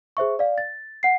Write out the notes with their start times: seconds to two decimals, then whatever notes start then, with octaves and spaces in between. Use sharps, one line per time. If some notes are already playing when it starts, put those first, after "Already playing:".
0.17 G#4 C5 E5 C#6
0.39 D5 F5
0.58 A6
1.03 F#5 C7